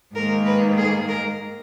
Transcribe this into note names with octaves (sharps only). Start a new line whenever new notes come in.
G#2 D#3 A#3 A#4
B4
G#4
A#4